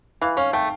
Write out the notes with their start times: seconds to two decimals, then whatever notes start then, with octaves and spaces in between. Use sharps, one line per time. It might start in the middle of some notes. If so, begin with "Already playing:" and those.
0.21 E3 F5
0.37 C#4 F5
0.53 A3 G5